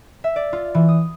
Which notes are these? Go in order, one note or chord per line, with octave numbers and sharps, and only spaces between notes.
E5
D5
F4
E3
D#6